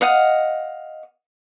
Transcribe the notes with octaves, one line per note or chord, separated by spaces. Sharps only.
D#5 F5 F#5